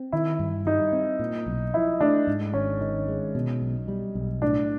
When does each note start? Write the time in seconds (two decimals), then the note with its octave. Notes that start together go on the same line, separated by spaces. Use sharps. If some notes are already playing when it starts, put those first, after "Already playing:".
Already playing: C4
0.12 D#3 E4
0.39 G2
0.66 G3 D#4
0.92 C4
1.19 A#2
1.46 B1
1.74 F3 E4
2.01 A3 D4
2.27 G#2
2.54 G#1 C#4
2.80 D#3 D#4
3.08 G#3
3.35 B2
3.62 B1
3.88 G3
4.15 B1
4.42 A2 D4